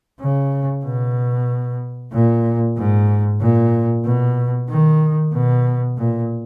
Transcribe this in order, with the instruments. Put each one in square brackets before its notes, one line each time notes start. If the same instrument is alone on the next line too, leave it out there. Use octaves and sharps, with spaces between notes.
[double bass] C#3
B2
A#2
G#2
A#2
B2
D#3
B2
A#2